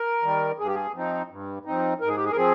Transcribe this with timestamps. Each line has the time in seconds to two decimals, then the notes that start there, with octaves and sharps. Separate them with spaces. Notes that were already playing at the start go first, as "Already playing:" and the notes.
Already playing: A#4
0.23 D#3 G3
0.59 G2 G#4
0.67 G4
0.75 G#4
0.94 F3 C4 D#4
1.30 G2
1.65 F3 C4 D#4
2.01 G#2 A#4
2.08 G#4
2.17 G4
2.25 G#4
2.32 A#4
2.36 F3 C4 G#4